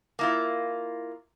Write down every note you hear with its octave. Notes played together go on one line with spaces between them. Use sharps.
A#3 E4 F4